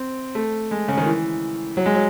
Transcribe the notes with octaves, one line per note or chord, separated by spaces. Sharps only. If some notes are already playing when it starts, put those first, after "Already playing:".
Already playing: C4
A3
G#3
C#3
D#3
E3
F#3
G#3
F#3